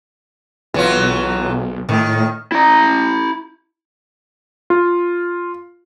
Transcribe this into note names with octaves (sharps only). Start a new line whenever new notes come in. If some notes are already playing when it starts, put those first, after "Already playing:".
B1 E3 F#3 F4
A2 D#3
E4 A#5
F4